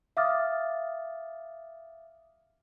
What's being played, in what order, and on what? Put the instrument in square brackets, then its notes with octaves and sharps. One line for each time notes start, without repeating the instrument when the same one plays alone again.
[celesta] E5 F5 D6 D#6 F6 A6